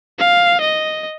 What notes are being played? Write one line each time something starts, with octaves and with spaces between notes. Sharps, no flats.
F5
D#5